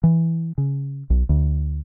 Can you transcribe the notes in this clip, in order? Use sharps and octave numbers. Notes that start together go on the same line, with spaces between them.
E3
C#3
B1
D2